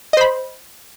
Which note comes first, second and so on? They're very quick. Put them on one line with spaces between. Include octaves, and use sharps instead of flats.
D#5 C5 B5